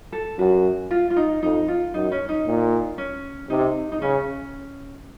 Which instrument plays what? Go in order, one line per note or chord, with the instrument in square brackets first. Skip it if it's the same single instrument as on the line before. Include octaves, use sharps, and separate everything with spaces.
[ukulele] A4
[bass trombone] F#2 [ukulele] F#4
[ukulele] F4
F4
D#4
[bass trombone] F2 [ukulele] D#4
[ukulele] F4
[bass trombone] F#2 [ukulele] D#4
[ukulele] C#4
D#4
[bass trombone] A#2
[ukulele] C#4
[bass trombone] C3 [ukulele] D#4
[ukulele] D#4
[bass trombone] C#3 [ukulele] C#4